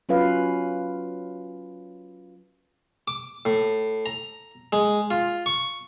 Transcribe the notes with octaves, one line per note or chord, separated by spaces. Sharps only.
F#3 C#4 F4 B4 F5
D6
A2
A#5
G#3
F4
C#6